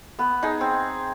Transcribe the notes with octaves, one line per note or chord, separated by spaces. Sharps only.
B3 B4
D#4 G#4
C4